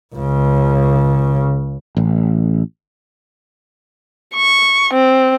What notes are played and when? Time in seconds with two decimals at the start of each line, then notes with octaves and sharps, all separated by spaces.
0.16 C#2 C#3
1.97 A1
4.35 C#6
4.94 C4